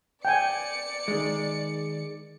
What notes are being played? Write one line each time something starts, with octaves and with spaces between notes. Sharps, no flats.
D5 G5 G#5 C#7
D#3 G#3